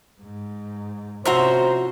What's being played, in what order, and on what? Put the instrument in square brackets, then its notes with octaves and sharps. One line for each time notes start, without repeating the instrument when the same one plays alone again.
[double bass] G#2
[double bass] C3 C#4 [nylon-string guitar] F3 F#4 [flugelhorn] C5 [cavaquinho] E5 A#5 C6